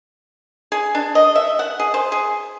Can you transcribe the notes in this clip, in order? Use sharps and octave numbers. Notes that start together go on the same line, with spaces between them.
G#4
D4
D#5
E5
F#5
G#4
C5
G#4